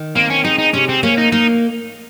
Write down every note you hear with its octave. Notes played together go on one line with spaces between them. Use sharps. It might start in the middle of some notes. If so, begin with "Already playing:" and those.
Already playing: D#3
A#3 C4
C#4
G#3 D#4
D#4
C3 C#4
C4
A#3 C#4
D#4
A#3 D#4